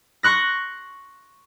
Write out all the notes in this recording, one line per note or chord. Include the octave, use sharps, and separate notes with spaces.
C6 C#6 F#6 A#6